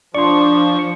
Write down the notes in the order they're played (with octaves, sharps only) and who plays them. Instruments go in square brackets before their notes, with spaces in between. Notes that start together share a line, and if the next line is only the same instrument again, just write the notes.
[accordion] F3 [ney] D4 [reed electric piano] D5 C6 [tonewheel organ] C#6